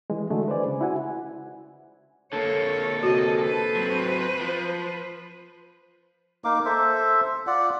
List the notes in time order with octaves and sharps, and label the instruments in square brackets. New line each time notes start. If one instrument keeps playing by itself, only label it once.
[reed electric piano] E3 G#3
D3 G#3 A3 F#4
B4 C5 D5 G#5
C#3
E4 F#4 F#5 G#5
[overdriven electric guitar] D3 A#3 [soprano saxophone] A4 [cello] C#5
[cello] C3 D#5 [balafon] F#4
[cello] B4 C5
[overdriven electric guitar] F#3 C4
F3
[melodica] A#3 D#4 F5 D6
A4 C5 E5
F4 D5 F#5